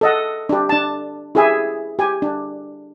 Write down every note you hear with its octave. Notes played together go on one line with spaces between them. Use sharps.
A4 D#5 F#5
D4 G4
D4 A5
E4 G4 G#4 E5 G#5
G4 G#5
D4